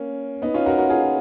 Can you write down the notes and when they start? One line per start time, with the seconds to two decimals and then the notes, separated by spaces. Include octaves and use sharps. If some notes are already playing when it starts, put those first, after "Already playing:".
Already playing: A#3 C#4
0.42 B3 D#4
0.54 C#4 F4
0.66 F#4 A#4
0.78 F#4 A#4
0.89 F4 G#4